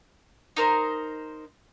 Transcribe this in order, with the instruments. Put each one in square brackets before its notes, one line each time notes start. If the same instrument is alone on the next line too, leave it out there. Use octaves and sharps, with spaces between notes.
[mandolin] D#4 A#4 C5